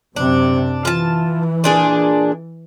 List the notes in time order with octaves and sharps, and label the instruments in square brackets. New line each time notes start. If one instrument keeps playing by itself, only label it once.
[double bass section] F#2 C3 [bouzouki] D4
[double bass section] E3 [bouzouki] F4 A5
[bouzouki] A#2 D4 G#4